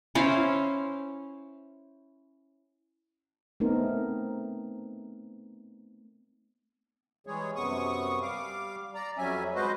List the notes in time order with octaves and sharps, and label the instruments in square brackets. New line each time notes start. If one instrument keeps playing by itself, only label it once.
[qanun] C#4 E4 C5 F5
[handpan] A3 B3 C4 D#4 A#4
[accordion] E3 G3 G#3 G#4 C#5
F#2 C3 B3 C#6 D#6
G3 F5 D6
D5 A#5
F2 F#3 G3 C#4 E5 G#5
G#3 F#4 B4 C5 D#5